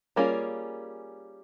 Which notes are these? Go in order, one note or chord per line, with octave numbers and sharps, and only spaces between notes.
G3 A#3 C#4 F4 G#4